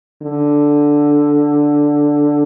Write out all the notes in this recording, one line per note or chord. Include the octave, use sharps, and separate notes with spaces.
D3